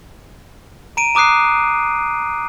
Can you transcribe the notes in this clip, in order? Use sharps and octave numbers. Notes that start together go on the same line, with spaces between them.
A#5 D7 D#7
A#5 D6 D#6 F#6 C7